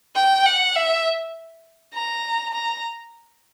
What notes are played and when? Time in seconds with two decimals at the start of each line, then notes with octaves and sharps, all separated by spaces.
0.16 G5
0.45 F#5
0.75 E5
1.94 A#5
2.53 A#5